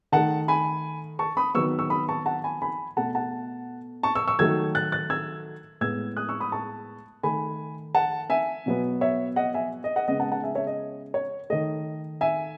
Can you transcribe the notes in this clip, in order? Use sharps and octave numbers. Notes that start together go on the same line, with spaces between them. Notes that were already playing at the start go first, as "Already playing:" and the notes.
D#3 A3 F#5 A5
G#5 B5
A5 C#6
B5 D#6
D#3 F#3 B3 C#6 E6
C#6 E6
B5 D#6
A5 C#6
F#5 A5
G#5 B5
G#5 B5
B2 A3 F#5 A5
F#5 A5
A5 C#6
C#6 E6
C#6 E6
D#3 F#3 A3 E6 G#6
F#6 A6
F#6 A6
E6 G#6
A2 G#3 B3 E6 G#6
D#6 F#6
C#6 E6
B5 D#6
A5 C#6
D#3 A3 G#5 B5
F#5 A5
E5 G#5
B2 F#3 B3
C#5 E5
D#5 F#5
E5 G#5
D#5
D#5 F#5
C#3 G#3 B3 D#5 F#5
F#5 A5
F#5 A5
E5 G#5
C#5 E5
D#5
C#5
D#3 A3 D#5
E5 G#5